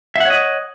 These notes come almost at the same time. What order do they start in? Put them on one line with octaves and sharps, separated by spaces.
E5 F#5 C#5 D#5